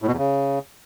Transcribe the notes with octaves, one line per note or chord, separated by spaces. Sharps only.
A2
B2
E2
C#3